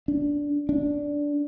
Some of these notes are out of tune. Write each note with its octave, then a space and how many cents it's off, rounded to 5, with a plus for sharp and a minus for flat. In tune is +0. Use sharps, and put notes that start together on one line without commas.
D4 -10
D4 -10